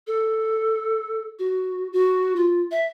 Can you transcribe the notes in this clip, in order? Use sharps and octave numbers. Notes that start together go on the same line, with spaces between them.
A4
F#4
F#4
F4
E5